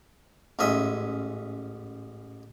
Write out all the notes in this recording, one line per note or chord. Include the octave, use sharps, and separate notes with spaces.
A1 G#2 C#4 D#5 E5